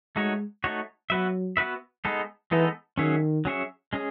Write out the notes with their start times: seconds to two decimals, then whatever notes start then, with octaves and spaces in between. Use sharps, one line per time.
0.16 G#3 A3 D#4 F#4 C#5
0.64 A3 D#4 F#4 C#5
1.10 F#3 B3 F#4 B4 E5
1.57 B3 F#4 B4 E5
2.05 G#3 B3 D#4 A4
2.51 E3 G#3 B3 D#4 A4
2.98 D#3 F#3 C#4 G#4 C#5 E5
3.45 F#3 C#4 G#4 C#5 E5
3.93 G#3 C#4 G#4